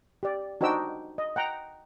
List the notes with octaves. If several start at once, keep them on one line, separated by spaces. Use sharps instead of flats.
G4 D5
D4 D#4 F#4 C5 G5 E6
D#5
F#5 G5 A#5